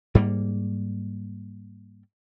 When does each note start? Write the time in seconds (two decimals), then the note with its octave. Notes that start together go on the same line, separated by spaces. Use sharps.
0.15 G#2 G3 A#3